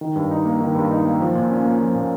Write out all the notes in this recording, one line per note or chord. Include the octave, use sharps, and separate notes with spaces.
D#3
G2
D#4
A#3
D#3
G2
D#4
A#3
F3
A#2
C#4
A#3
F3
A#2